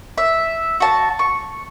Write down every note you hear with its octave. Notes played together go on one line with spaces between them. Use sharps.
E5
F#4 A5
C#6